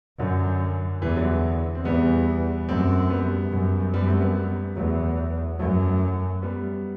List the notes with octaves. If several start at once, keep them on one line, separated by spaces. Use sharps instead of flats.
F#2 D3 F#3
E2 E3 G3
D3 F#3
C4
E2 G3 B3
F#2 A3 C4
G3 B3
F#2
F#2 G3 B3
A3 C4
G3 B3
G3 B3
E2 F#3 A3
F#2 F#3 A3
G3 B3